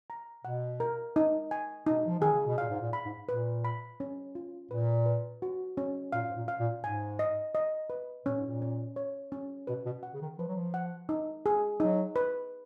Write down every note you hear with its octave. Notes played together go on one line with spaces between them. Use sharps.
A#5
B2 F#5
A#4
D#4
G#5
B2 D#4
F3
D#3 G#4
C#3
B2
A#2 F5
G#2
A#2
B5
G#2
A#2 B4
B5
C#4
F4
A#2 B4
B4
F#4
C#4
A#2 F5
G#2
A#2
F5
A#2
G#2 G#5
D#5
D#5
B4
A#2 C#4
G#2
A#2
C#4
C#5
C#4
B2 B4
B2
F#5
C#3
D#3
F3 B4
F#3
F3
F#5
D#4
G#4
F#3 D#4
B4